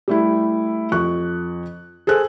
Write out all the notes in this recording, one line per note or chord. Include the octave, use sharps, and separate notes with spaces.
G3 A3 E4
F2 C#6 F#6
G#4 A4 C5 F#6